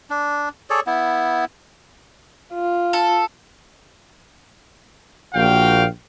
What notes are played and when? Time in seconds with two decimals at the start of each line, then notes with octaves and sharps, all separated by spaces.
0.10 D4
0.70 G#4 A4 C#5 D5
0.87 B3 E4
2.54 F4
2.93 A4
5.34 A#1 A#2 F#4 F5 G5